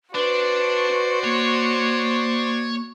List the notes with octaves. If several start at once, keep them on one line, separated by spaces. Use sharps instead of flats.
D4 F#4 B4 C5 D5
A#3 C#5